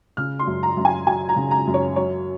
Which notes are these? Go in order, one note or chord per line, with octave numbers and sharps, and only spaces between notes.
C#3 F6
C6
F#2
A#5
F#2
G#5
F#3 G#5
A#5
C#3
A#5
F#2
C#5
F#3 C#5